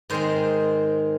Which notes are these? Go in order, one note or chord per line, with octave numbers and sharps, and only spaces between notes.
G#2 D#3 G#3 C4 C5